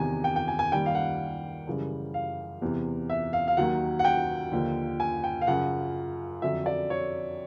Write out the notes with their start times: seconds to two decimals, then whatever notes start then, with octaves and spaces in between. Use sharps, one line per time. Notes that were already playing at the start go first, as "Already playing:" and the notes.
Already playing: E2 C3 D#3 G#5
0.24 G5
0.36 G5
0.48 G#5
0.59 G#5
0.72 D#2 D#3 G3 G5
0.86 F5
0.95 F#5
1.67 F#2 C#3 E3 G3
2.14 F5
2.62 E2 C3 E3
3.10 E5
3.33 F5
3.48 F5
3.57 D#2 D#3 F#3 F#5
3.99 F#5
4.04 G5
4.52 D#2 D3 F3
5.00 G#5
5.24 G5
5.41 F5
5.47 F#2 C#3 F3 F#5
6.42 F2 D3 F#3 E5
6.66 D5
6.90 C#5